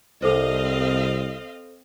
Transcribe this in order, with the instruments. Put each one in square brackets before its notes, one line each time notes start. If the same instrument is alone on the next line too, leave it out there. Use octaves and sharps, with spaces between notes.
[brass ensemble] C2 [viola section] C4 D#5 F5 [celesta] A4 C5